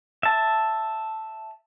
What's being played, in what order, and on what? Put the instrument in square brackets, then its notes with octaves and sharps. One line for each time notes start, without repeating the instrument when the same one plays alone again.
[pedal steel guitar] E5 A5